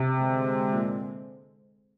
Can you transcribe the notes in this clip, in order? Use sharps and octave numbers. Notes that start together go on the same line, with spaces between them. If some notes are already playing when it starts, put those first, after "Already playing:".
Already playing: C3
D3 G#3 C4
A#2